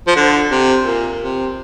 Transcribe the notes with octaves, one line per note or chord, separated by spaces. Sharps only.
F3
D3
C3
A#2
C3